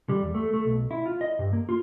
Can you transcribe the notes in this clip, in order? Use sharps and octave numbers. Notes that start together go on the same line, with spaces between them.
G3
E2
A3
A3
B1
E4
F4
D#5
G2
A#3
F4